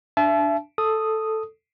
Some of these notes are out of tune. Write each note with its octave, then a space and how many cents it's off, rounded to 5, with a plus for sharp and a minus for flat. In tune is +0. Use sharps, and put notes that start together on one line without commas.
D4 +0 E5 +30 A5 -35
A4 +0 D#6 +0